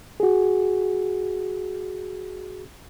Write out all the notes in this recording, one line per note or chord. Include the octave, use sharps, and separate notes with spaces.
F#4 G#4